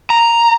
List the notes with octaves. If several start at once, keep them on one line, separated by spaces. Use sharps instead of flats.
A#5